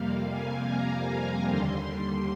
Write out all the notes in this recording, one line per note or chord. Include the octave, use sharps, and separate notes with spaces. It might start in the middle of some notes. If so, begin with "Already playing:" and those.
Already playing: F2 C3 G3 A#3 F5
G#5
A#5
D#2 D3 G3 C6